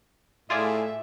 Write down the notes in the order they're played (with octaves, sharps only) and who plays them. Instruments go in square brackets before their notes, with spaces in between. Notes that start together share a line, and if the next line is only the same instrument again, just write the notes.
[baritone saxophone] A2 [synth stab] F4 G#4 D5 [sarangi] E5